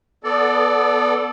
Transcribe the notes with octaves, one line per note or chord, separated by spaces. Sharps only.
B3 A4 D5